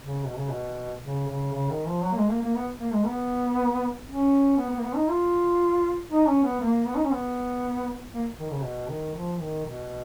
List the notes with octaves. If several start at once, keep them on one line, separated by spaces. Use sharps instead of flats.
C#3
B2
C#3
B2
C#3
C#3
C#3
D#3
F3
F#3
A#3
G#3
A#3
A#3
B3
A#3
G#3
B3
C#4
B3
B3
A#3
B3
D#4
F4
D#4
C#4
B3
A#3
B3
D#4
C#4
B3
A#3
D#3
C#3
B2
D#3
F3
D#3
B2